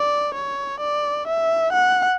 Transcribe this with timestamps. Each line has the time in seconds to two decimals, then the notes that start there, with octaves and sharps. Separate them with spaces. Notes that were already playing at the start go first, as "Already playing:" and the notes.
Already playing: D5
0.35 C#5
0.81 D5
1.28 E5
1.73 F#5